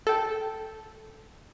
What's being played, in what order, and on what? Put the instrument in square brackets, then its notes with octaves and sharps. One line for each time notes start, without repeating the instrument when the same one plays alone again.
[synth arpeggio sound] A4 G5